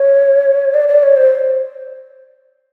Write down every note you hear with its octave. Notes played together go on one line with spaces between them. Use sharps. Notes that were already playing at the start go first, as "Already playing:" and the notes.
Already playing: C#5
D5
D5
C#5
C5